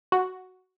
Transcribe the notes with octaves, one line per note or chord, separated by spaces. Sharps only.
F#4